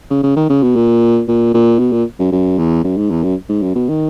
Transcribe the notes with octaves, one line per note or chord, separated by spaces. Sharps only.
C#3
C#3
D#3
C#3
B2
A#2
A#2
A#2
B2
A#2
F#2
F#2
E2
F#2
G#2
E2
F#2
G#2
F#2
B2
D#3